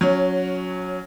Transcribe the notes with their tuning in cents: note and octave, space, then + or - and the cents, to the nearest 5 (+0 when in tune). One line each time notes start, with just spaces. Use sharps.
F#3 -15 C#4 +10